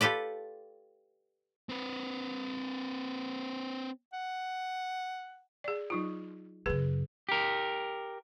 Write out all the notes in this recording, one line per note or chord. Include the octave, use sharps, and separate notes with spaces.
F4 G4 A4 B4 D5
C4 B4
F#5
G#4 D5
F#3 D#4 F4
F#2 C#3 G#4 B4
G4 A#4